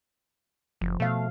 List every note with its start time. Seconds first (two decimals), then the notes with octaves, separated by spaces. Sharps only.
0.81 F#1 F3
1.00 B2 A3 F5